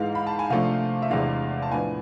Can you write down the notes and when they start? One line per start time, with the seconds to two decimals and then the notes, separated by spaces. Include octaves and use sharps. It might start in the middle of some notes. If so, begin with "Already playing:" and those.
Already playing: G#2 E3 G#3 F5
0.15 B5
0.27 A5
0.39 G#5
0.50 C3 F3 A3 D4 F5
1.02 E5
1.10 E2 C3 G#3 D4 F5
1.62 A5
1.70 A2 F3 B3 D4 G#5